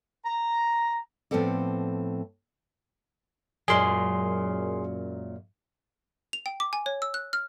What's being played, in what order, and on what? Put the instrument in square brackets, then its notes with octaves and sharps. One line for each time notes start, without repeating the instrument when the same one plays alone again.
[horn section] A#5
[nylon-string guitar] A2 F3 B3 C4 A4 D5
[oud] F#2 A#2 G#3 [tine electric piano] G#4 C6
[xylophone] F7
G5
D6
G#5
C#5
E6
F#6
F6